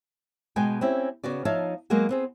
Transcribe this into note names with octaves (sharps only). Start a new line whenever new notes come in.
B2 G#3 B3 G5 G#5
C4 C#4 E4 G4
C#3 B3 F#4 D5
F3 D#4 C#5 E5 F5 A5
F#3 G#3 A#3 B3 F#4 G#4
B3 C4 G#4